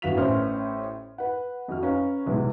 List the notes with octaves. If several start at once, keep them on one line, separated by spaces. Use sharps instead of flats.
G1 E3 F#4 F5 B6 F7
A1 A2 B3 C#4 C5 F6
B4 F#5
F2 F#4 F6
C#4 B4 F5 A#5
B1 C3 E3 G#3